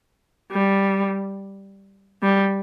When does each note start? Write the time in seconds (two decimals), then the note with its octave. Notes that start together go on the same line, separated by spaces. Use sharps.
0.52 G3
2.22 G3